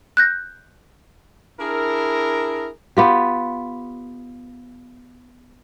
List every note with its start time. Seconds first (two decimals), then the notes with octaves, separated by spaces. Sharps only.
0.17 F#6 G6 A#6
1.60 D4 E4 G#4 A#4
2.97 B3 F4 G4